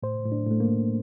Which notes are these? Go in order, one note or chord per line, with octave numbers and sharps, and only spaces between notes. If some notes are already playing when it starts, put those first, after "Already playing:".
A2 C5
A2
D4
A2 A3
A#3
A2